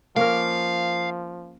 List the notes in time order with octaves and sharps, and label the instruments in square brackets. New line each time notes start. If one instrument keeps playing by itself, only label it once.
[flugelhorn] F3 [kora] A#3 C#4 A#4 [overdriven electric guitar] F5